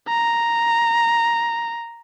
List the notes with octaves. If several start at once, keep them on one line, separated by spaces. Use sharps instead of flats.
A#5